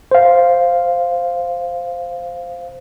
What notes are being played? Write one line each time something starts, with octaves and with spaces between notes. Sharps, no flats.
C5 F5